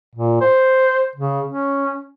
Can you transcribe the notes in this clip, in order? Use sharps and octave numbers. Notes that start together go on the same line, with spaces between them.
A#2
C5
C#3
C#4